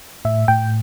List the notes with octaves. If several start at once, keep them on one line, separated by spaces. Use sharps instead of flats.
A2 E5
A2 G5